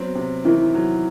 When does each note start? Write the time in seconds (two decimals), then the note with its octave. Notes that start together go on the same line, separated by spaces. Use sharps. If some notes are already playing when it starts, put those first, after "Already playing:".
Already playing: F#3 B3 C4
0.15 C3
0.45 D#3 E3
0.74 F#3